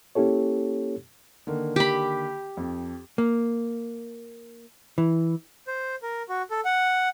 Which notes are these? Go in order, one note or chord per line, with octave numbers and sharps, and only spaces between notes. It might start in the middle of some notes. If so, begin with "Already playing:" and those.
A#3 C#4 E4 G4 A4 C#5
D3 D#3 A#3
G4 B5
F2
A#3
E3
C5
A#4
F#4
A4
F#5